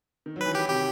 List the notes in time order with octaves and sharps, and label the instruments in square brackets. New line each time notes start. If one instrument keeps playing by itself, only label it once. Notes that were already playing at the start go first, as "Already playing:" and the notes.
[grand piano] D#3
F#3
[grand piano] E3 [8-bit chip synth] B4
[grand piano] D#3 [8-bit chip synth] G4
[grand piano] C3 [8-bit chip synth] G4